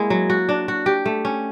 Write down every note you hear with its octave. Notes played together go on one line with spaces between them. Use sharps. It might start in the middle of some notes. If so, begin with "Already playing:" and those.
Already playing: G#3 A#3 E4
F#3
F#4
D4
F#4
G4
A3
C#4